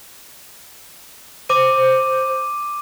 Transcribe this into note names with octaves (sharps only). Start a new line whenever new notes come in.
C5 D6 D#7